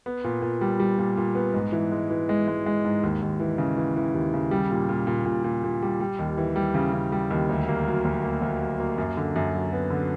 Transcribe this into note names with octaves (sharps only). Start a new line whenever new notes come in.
B3
A#2
A#2
G3
G3
A#2
A#2
B3
G#2
E3
G#3
E3
G#3
G#3
G#3
G#2
D#2
D#2
E3
C#3
E3
E3
D#2
C#3
G3
A#2
A#2
A#2
A#2
A#2
A#2
G3
G3
D#2
E3
G3
C#3
C#3
G3
D#2
D2
A#3
F#3
D2
A#3
D2
F#3
A#3
F#2
D3
F#2
F#3
B3
D3